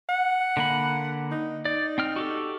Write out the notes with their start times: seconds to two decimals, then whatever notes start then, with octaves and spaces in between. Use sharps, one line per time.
0.09 F#5
0.57 D3 A#3 B5
1.31 D#4
1.65 D#4 D5
1.98 C4 G5 F6
2.16 F#4 G4 A4